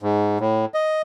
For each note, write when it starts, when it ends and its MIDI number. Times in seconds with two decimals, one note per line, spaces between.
0.03 0.38 44
0.40 0.65 45
0.74 1.02 75